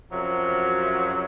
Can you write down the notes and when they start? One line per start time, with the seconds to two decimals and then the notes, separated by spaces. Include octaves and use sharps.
0.11 F#2 C3 F3 F#3